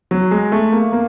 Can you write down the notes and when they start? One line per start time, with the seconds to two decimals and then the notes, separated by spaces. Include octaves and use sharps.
0.11 F#3
0.31 G#3
0.52 A3
0.72 A#3
0.93 A#3